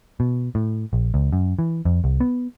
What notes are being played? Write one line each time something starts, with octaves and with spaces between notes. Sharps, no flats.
B2
A2
A#1
C#2
F#2
E3
F2
C2
B3